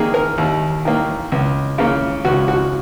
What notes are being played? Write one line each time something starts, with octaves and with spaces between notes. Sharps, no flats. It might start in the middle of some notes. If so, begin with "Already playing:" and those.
Already playing: D#2 D#3 A#3 G#4
A#4
D#2
D#3 A#3
C#2
C#3 A#3
C#2 F#4
F#4